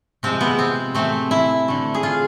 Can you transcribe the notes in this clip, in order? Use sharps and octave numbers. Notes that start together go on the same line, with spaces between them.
C3 F3 G#3 C4
B3
C4
A2 E3 A3 C4
E4
D3 A3
G#4
F4